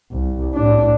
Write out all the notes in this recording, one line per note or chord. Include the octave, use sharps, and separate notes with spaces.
C2
A2 D4